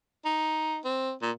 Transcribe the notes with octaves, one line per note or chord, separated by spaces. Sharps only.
D#4
C4
A#2